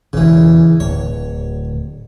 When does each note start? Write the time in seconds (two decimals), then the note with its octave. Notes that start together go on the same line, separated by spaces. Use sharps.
0.13 E1 G#2 C#3 E3
0.80 D1 C#5